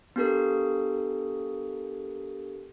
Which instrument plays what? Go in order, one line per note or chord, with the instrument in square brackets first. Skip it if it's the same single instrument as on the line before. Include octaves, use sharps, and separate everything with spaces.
[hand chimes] B3 D4 G4 A4 A#4